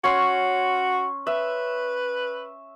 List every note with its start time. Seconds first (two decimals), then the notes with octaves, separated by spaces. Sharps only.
0.04 C#4 F#4 C6
1.27 B4 E5